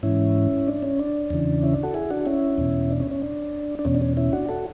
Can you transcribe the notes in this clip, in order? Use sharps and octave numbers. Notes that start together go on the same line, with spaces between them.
G#2 E3 C#4 E4
D4
C#4
D4
E2 C#3 E3
C#4 E4
D4
F#4 A4
E4 G#4
D4 F#4
C#4 E4
E2 B2
D4
C#4
C#4
D4
D4
E2 B2 C#4
D4
C#4
C#4 E4
D4 F#4
F#4 A4